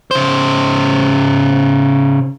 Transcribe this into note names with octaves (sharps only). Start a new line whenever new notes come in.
C#3 C5